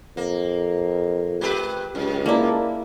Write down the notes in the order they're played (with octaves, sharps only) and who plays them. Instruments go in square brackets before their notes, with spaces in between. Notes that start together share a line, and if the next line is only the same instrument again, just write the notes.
[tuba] F2 [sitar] A#3
[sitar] G#3 G4 B4
[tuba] C#2 [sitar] F#2
[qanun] A#3 E4 [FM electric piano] A#4 D5 A5